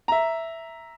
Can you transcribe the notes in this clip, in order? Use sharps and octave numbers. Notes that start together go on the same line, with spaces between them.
E5 A#5